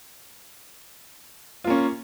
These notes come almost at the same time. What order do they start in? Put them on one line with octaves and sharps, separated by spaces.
F4 A#3 C#4